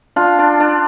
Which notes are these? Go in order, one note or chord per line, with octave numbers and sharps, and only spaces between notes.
D4 F4
D4
D4